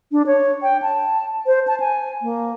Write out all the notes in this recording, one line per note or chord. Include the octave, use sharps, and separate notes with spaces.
D4
C#5
G5
A5
C5
A5
G#5
A#3